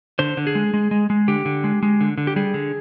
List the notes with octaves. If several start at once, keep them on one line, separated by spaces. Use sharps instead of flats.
D3 C5
D3
G#4
G#3
G#3
G#3
G#3
D3 G4
D3
G#3
G#3
D3
D3
G4
G3 G#4
D3